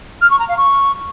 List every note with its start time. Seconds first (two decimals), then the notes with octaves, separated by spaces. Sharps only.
0.22 F6
0.31 C#6
0.39 A#5
0.48 F5
0.57 C#6